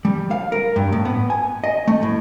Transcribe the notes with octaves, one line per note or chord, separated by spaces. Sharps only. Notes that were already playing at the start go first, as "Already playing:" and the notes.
G3
F5
A#4
G2
A2
B3
G#5
D#5
A3
A2